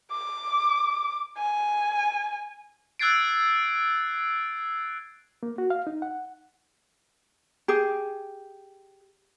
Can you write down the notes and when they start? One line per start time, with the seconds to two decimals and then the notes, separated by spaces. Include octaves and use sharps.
0.12 D6
1.38 G#5
2.99 E6 F#6 G#6 A6 C7 D7
5.43 A#3
5.58 F#4
5.70 F5
5.87 D#4
6.02 F#5
7.68 G4 G#4